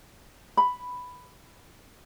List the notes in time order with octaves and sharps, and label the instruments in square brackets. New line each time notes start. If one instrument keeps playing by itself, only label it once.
[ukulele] B5